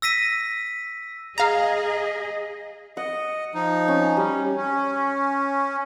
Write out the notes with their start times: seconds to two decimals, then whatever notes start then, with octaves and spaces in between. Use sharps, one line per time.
0.02 E6 A#6 B6 D#7
1.38 G#4 D#5 F5 A#5
2.97 D#5 F#5
3.54 F3 D#4
3.88 C#4
4.17 G3 C#4
4.56 C#4